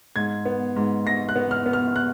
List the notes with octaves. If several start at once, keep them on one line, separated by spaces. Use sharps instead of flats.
G#2 G#6
B3
G#2
G#2 A#6
F#6
B3
F6
B3
F6
F#6